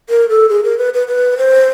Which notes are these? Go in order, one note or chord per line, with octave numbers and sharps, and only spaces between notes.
A#4
A4
G#4
A#4
B4
B4
B4
C5